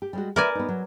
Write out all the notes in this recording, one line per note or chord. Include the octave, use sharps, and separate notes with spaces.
G4
G3 G#3 F#4
A#4 B4 D5 E5 G#5
B3 D#4
F#3